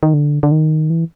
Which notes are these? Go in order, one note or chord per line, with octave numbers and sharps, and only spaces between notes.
D#3
D3
D3
D#3
E3